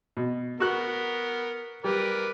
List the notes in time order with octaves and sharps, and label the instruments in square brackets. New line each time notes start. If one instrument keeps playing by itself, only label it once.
[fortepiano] B2
[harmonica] B3 A#4 [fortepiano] F#4 F#6
[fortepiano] G3 [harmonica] A#4 B4 D5